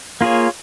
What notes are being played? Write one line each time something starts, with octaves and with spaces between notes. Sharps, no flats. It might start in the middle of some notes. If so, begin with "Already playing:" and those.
A#3 F4 G#4 C#5